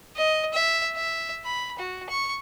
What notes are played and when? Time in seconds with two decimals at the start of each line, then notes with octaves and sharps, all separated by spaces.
0.17 D#5
0.54 E5
0.96 E5
1.45 B5
1.79 F#4
2.09 C#6